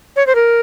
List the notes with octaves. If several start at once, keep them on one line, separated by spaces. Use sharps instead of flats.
C#5
C5
A#4